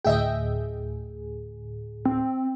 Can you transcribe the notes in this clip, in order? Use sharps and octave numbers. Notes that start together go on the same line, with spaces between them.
D2 A2 G#4 D#5 E5 G5
C4